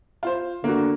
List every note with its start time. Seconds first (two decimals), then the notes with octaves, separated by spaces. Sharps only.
0.23 F4 C5
0.64 D3 A#3 F#4